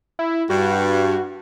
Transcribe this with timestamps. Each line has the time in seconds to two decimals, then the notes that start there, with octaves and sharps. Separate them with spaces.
0.19 E4
0.50 G2 F#4